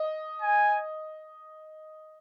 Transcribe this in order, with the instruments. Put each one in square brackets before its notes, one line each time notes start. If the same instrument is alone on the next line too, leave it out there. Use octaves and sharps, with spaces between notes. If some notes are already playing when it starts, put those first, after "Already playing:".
Already playing: [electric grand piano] D#5
[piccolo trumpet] G#5